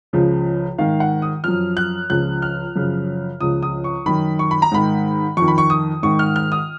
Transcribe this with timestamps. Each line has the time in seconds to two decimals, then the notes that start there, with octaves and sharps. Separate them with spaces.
0.13 C#2 C#3 F3
0.78 G#2 D#3 F5
1.00 F#5
1.22 D#6
1.44 F#2 F3 F6
1.77 F#6
2.10 C#2 C#3 F3 F#6
2.42 F6
2.76 F#2 C#3 F3
3.40 C#2 C#3 F3 D#6
3.63 D#6
3.84 C#6
4.06 F#2 D#3 B5
4.39 C#6
4.51 B5
4.62 A#5
4.71 G#2 D#3 B5
5.37 F2 C#6
5.42 D#3
5.48 B5
5.58 C#6
5.70 D#6
6.03 G#2 D#3 C#6
6.19 F6
6.36 F6
6.52 D#6